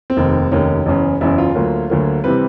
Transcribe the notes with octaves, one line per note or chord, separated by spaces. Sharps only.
C4
F1 D#2 D#3
F1 D#2 D#3 C#4
F#1 E2 C#3
F#1 E2 C#3 E4
F4
D2 D3 F#3 A#3
D2 D3 F#3 A#3
C3 E3 G3 C4 B4